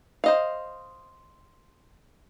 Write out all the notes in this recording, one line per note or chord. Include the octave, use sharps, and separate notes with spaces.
C5 D#5 F5